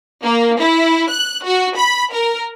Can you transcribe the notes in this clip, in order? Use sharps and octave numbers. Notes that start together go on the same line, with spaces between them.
A#3
E4
F#6
F#4
B5
A#4